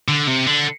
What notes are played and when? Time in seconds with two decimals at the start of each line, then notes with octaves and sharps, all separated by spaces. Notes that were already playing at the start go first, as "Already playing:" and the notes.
0.08 D3
0.27 C3
0.47 D3